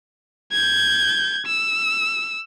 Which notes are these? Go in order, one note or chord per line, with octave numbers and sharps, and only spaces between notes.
G6 G#6
E6